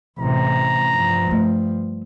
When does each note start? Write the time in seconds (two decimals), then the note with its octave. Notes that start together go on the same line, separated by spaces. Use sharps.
0.19 A1 C3 A#5
0.90 G2 F3
1.27 G3 A3